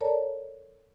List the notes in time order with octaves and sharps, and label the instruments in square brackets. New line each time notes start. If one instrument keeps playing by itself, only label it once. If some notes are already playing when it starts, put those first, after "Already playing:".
[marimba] A4 A#4 C#5 D5 A5 A#5